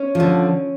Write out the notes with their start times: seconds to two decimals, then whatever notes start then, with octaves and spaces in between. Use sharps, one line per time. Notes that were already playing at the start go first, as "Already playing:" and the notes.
Already playing: C#4
0.15 D3 F3